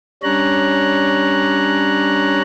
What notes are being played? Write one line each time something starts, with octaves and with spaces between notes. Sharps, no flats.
G3 C#4 D4 C#5 A#5 F#6